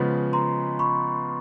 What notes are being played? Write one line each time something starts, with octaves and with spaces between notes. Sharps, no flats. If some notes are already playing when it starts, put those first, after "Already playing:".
Already playing: C#3 F3 G#3 B3
A#5 C6
B5 C#6